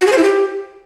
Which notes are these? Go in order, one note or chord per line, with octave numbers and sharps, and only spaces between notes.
F#4
G#4
C5
E4
G4